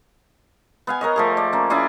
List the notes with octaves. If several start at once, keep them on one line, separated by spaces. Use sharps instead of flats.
B3 F5 G#5
A#4 C#5 D#5
F3 A3 G#4
D5
A#3 C#4
C#4 E4 G#4 D5